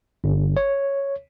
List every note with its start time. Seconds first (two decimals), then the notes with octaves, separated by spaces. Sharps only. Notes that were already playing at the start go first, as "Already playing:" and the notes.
0.24 G1
0.57 C#5